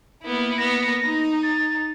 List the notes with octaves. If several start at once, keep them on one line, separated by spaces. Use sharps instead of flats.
A#3 B3 E4
A#3 B3 A#6
D#4
A6